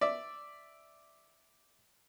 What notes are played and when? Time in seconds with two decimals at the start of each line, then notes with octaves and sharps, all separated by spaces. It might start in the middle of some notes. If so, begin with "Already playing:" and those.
0.01 D5 E5